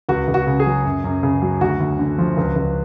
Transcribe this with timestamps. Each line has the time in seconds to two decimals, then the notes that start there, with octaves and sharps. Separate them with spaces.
0.09 C#2 F#4
0.28 C#2
0.34 F#4
0.47 C#3
0.60 G#4
0.66 F#3
0.85 F#2
1.04 F#2
1.23 C#3
1.42 F#3
1.61 D2 F#4
1.80 D2
1.99 D3
2.18 F3
2.37 C#2
2.56 C#2